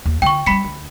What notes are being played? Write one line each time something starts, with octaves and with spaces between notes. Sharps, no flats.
D#2
D3 F4 G5 C#6
G3 C#4 B5 B6 C#7
D2